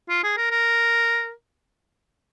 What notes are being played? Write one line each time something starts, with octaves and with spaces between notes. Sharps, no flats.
F4
G#4
A#4
A#4